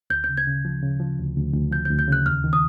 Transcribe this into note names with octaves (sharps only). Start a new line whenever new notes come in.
D2 G6
G6
C#3
G#6
C#3
F3
C#3
F3
D2
D2
D2
F3 G6
D2 G6
G6
C#3 F#6
D#2 F6
D#3
D#6